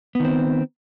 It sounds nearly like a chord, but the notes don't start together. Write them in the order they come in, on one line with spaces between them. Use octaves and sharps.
B3 D#3 C4